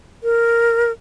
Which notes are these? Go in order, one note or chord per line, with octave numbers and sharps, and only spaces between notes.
A#4